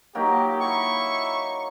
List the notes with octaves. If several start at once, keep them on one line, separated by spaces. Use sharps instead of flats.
F#3 A#3 D#4 G4
E4 C#6